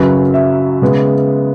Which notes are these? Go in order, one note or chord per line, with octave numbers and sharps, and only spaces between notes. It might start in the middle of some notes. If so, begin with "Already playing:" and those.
Already playing: F#2 C#3 F#3 B4
E5
C#3 G#3 B3